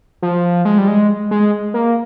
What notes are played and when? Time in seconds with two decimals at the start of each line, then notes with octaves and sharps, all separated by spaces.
0.22 F3
0.65 G#3
0.78 G3
0.88 G#3
1.31 G#3
1.74 A#3